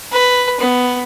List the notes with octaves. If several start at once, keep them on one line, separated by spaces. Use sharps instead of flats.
B4
B3